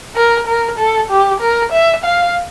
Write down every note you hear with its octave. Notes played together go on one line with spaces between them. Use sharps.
A#4
A#4
A4
G4
A#4
E5
F5